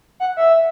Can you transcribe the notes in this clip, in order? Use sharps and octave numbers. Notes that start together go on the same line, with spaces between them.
F#5
E5